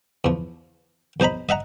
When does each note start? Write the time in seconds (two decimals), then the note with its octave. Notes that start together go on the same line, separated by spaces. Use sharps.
0.24 E2 F3
1.20 B1 C5 D#5 A#5 B5
1.49 D#5 E5 F#5 A#5